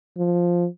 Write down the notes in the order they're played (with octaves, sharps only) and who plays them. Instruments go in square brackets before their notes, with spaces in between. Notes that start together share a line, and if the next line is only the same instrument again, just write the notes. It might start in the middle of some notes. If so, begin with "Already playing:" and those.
[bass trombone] F3